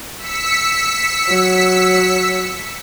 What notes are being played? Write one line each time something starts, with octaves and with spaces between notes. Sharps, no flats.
E6 B6 C#7
F#3